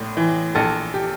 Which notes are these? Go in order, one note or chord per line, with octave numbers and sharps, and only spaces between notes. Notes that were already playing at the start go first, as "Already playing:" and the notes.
Already playing: A#1 A2
E3
A#1 A4
G4